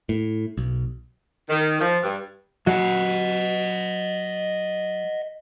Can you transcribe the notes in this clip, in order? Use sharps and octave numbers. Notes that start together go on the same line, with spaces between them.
A2
B1
D#3
F3
G2
F#3 D#5 F#5